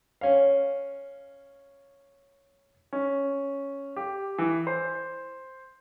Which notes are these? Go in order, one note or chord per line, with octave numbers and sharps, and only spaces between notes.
C#4 F5
C#4
G4
E3
C5